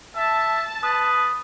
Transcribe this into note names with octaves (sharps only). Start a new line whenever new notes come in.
E5 A5
B4 D#6